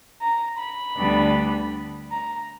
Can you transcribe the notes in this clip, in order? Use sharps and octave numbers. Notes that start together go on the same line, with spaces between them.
A#5
B5
D2 D3 G3 B3 D4
A#5